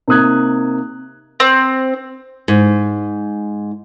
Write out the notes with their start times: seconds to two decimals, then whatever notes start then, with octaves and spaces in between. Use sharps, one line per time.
0.08 C3 A#3 D#4 D#6 F#6 G#6
1.40 C4
2.48 G#2